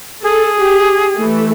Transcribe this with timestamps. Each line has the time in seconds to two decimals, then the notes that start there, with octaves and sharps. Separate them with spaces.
0.23 G#4 A4
0.60 G4
1.18 E3 A3